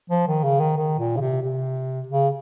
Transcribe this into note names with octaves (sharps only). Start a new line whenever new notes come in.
F3
D#3
C#3
D#3
D#3
A#2
C#3
C3
C3
C#3